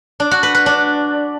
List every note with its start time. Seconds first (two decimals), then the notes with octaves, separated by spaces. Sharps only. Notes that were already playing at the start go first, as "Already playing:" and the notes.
0.20 D4
0.31 F#4
0.43 B4
0.55 B4
0.66 D4